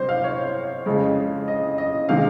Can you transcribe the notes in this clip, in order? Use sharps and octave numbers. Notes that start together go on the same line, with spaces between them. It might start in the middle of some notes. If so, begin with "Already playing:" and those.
Already playing: C3 G3 C5
F5
C#5
F2 C#3 G#3
D#5
D#5
C3 D#3 G#3 F5